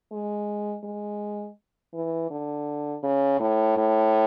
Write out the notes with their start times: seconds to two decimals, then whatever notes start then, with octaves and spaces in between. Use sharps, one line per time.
0.12 G#3
0.84 G#3
1.94 E3
2.31 D3
3.03 C#3
3.40 A2
3.77 A2